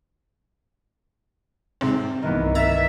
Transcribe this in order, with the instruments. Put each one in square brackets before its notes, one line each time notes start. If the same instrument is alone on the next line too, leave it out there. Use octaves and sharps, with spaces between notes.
[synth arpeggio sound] G#2 C3 C4
[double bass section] C2 G2 [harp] D#3 E3 B3
[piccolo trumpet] E5 [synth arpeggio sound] A#5 G#6 A6